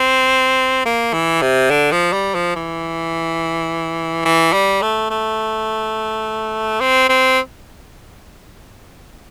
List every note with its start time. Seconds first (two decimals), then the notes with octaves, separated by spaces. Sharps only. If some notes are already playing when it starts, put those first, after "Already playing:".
Already playing: C4
0.86 A#3
1.13 E3
1.42 C3
1.71 D3
1.92 F3
2.12 G3
2.34 F3
2.56 E3
4.25 E3
4.53 G3
4.82 A3
5.10 A3
6.80 C4
7.09 C4